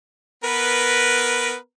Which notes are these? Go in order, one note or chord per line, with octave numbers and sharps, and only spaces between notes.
B3 A#4 B4